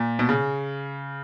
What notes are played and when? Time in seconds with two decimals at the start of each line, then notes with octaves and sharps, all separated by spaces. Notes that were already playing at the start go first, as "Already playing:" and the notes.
Already playing: A#2
0.19 B2
0.29 C#3